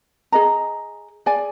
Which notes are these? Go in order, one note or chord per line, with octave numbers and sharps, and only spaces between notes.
G#4 D#5 A#5
G#4 D5 G#5